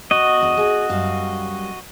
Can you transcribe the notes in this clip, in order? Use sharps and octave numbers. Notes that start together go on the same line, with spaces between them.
B3 F#4 D#5
E2 D4
G#4 E5 G#5
F#2 G3 F5